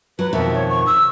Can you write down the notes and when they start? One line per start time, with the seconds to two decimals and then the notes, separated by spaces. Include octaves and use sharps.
0.19 F#3 B4
0.33 F2 B2 D#3 E5
0.55 C#5
0.70 C#6
0.87 E6